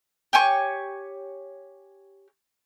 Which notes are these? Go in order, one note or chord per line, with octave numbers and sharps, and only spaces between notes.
G4 C#5 G#5 C#6